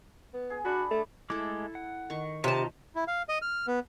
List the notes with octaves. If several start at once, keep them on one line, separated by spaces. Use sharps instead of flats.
B3
G#4
D4 F#4 D5 B5
A3
G#3 A3 E4 A4 D6
F#5
D#3 C#6
C3 D#4 F4 A5 A#5
E4
F5
D#5
F6
B3